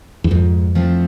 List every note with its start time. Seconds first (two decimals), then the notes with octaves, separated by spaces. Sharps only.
0.24 E2
0.31 F2 G#2
0.75 F3 A3 C4